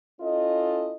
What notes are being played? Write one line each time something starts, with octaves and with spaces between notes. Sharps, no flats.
C#4 E4 F4 A4 D#5